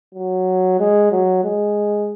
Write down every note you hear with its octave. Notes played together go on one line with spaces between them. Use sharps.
F#3
G#3
F#3
G#3